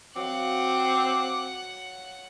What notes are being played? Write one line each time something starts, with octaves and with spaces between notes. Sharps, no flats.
F#3 C4 D#5 F5 F#5 D6